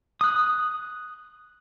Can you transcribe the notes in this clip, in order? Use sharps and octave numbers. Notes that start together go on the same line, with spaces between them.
D#6 F#6